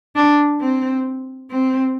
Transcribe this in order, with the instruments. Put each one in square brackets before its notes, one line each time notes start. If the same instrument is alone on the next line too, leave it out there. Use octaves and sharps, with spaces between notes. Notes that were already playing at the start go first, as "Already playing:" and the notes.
[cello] D4
C4
C4